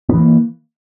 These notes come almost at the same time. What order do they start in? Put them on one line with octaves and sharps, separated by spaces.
B3 E3 A#3